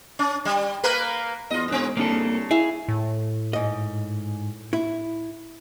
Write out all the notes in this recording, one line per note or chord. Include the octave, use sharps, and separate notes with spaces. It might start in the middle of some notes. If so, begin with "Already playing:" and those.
C#4
G3
A#3 A#4 B4
E2 F4 D#5
E1 G#2 C4
C2 C#3 A#3 D4 A4
E4 G#4 E5 F5
A2
G#2 D#5
E4